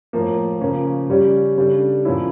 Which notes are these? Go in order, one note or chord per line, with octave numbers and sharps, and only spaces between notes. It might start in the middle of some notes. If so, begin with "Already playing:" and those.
A2 F3 A#3
C#3 F3 A#3 C#4
C#3 G3 C#4 G4 D5
C#3 G3 D4 A4
A#2 F3 C#4 E4